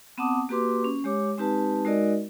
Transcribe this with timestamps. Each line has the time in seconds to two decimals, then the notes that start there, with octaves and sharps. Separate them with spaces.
0.18 B3 C4 F#5 A5 D6 D#6
0.49 A#3 F#4 G4 B4 C6 D6
0.84 C#4
1.04 G#3 G4 C#5 D6
1.38 G#3 C4 D#4 G4 B4 A5
1.85 G#3 D#4 F#4 A#4 D5 D#5